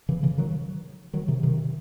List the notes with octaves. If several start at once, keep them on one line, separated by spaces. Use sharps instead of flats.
C#3 E3
C#3 E3
D#3 F#3
D#3 F#3
C3 D#3
C3 D#3